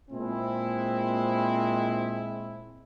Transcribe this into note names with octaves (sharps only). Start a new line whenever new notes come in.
A#2 G#3 C4 E4